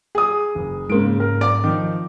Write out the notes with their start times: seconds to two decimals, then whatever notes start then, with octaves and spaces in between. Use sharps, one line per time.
0.15 G#4 D#6
0.55 F#1
0.90 G#2 C#3 A#3 C6 D7
1.20 A#4
1.41 D5 D6
1.64 D#3 F3